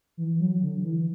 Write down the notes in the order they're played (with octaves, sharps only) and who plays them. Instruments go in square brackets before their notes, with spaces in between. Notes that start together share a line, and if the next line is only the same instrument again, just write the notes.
[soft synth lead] E3
F#3
D3
E3